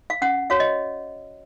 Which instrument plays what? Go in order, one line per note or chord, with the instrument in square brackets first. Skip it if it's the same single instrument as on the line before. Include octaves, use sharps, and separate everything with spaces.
[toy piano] F5
C#4 F#5
F#4 C#5 F5
D#5